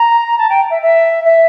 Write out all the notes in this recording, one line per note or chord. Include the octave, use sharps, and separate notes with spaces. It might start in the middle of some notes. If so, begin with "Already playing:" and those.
Already playing: A#5
A5
G5
E5
E5
E5